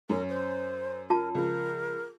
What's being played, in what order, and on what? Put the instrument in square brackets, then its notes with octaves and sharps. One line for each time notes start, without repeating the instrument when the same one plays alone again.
[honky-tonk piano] F#2 C#4 [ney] A#4
[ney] C5
[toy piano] F4 A5 [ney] A#4
[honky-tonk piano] C#2 F3 [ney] A#4